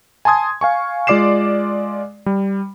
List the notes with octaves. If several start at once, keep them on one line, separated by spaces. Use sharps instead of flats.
G#5 A5 C6 D#6 G#6
F5 G#5 C#6
G#3 F4 D5 D6 C7 E7
G3